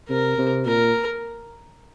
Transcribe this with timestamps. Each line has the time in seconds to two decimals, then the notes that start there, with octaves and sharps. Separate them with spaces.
0.09 C3 A#4
0.38 C3
0.66 A#2 A#4